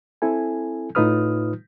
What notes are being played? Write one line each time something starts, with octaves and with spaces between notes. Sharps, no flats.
C4 E4 A4 G#5
A2 D#4 F4 B4 D#6 F6